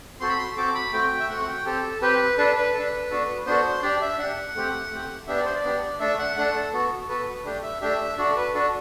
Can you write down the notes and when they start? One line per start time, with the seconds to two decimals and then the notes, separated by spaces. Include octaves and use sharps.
0.20 C4 F#4 A4 C6
0.29 B5
0.38 C6
0.57 C4 F#4 A4 D6
0.75 B5
0.92 A3 C4 F#4 G5
1.20 E5
1.29 A3 C4 F#4 F#5
1.43 F#5
1.48 G5
1.65 C4 G4 A4
2.02 C4 G4 B4
2.38 D4 A4 B4
2.56 B4
2.74 D4 A4
3.10 B3 D4 F#4 A4
3.46 B3 D4 F#4 A4 C5
3.82 D4 G4 D5
4.01 E5
4.18 D4 G4 F#5
4.55 A3 C4 G4
4.91 A3 C4 G4
5.27 B3 D4 G4 E5
5.37 D5
5.45 C5
5.54 D5
5.64 B3 D4 G4
6.00 A3 D4 A4 E5
6.19 F#5
6.36 A3 D4 A4 F#5
6.55 A4
6.72 B3 F#4 A4
7.09 B3 F#4 A4 B4
7.45 A3 D4 G4
7.63 E5
7.81 A3 D4 G4 E5
8.17 D4 F#4 A4 D5
8.30 A4
8.36 B4
8.54 D4 F#4 A4